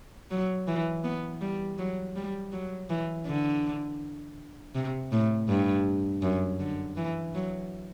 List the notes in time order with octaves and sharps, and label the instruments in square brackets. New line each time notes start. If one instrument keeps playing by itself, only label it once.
[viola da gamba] F#3
E3
B3
G3
F#3
G3
F#3
E3
D3
C3
A2
G2
F#2
D3
E3
F#3